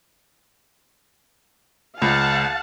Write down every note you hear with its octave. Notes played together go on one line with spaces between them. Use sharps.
C#2 F5 F#5 A5